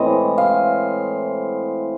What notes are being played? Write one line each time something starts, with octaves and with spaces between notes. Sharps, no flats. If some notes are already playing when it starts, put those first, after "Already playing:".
Already playing: A2 E3 G#3 C4 D#5
F5